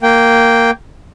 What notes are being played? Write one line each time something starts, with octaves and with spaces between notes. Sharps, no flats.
A#3 G5